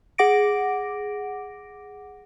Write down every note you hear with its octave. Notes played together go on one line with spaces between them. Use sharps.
G#4 F#5 D6 A#6 D7